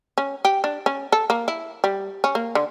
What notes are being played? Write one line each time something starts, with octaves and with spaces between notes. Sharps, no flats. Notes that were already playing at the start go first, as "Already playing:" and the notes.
C#4
G4
D4
C#4
A4
A#3
E4
G3
C#4
A#3
D3